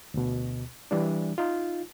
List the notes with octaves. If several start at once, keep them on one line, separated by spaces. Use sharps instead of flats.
D2 B2
E3 G3 D4
D#4 F4